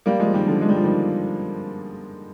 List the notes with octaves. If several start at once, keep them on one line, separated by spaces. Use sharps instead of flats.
G3 A#3
F3 G#3
D#3 G3
D3 F3
G#3
G3
F3
D#3 G3